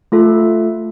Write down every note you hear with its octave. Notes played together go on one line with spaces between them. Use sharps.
A3 F4 A4